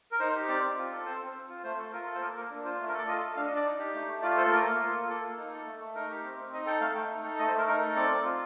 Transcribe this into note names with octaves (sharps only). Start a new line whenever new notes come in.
A#4
D#4 C5
G4
C4 D5
C4
F4
A4
C4 C5
C4
C4
F4
A3 C5
A4
F4 A#4
A4
C5
A#3 A#4
A#3 A#4
D4
F4 C5
A3
A#4
A4 D5
F4 D#5
A4
D4 F5
D#5
D4
D5
D#4
G4
A3
A3
F4 D5
A4 C5
A#3 A#4
A#3
F4
A4
A#3 A4
A#3
D#4
A4
A3
A3
D#4 A#4
G4
C4
C4
D#4 D#5
A4 G5
A3 F5
A3 G5
D#4
A4
A3 D#5
C5
A3 A#4
D#4 A#4
A4
C4 D5
C4
F4